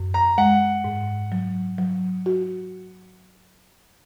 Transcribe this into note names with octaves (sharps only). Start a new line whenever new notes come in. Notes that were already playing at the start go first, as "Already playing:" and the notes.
Already playing: F#2
A#5
G#3 F#5
G#2
F#3
F#3
F#4